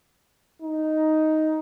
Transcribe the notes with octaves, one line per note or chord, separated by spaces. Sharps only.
D#4